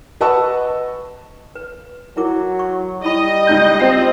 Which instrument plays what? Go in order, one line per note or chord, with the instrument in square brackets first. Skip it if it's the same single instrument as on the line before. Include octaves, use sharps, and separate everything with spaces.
[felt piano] B4 D#5 F#5 A5 C#6 E6
[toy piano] B4
[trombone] F#3 [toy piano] E4 A#4 D6
[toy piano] C#6
[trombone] G3 [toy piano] E4 B5 [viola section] D#5
[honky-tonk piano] C#2 D#4 G6
C4 F4 C7